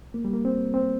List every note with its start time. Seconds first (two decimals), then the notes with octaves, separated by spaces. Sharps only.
0.14 A#3
0.25 G3
0.33 A#3
0.45 C4
0.74 C4